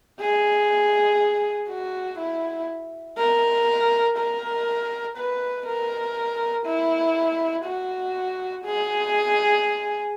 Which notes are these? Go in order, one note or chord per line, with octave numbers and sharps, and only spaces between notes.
G#4
F#4
E4
A#4
A#4
B4
A#4
E4
F#4
G#4